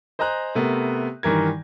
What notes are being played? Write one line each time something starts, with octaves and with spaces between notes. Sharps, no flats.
C5 D#5 G#5 A#5 F#6
C3 A3 B3 A#4
G2 D#3 E3 A#4 G#6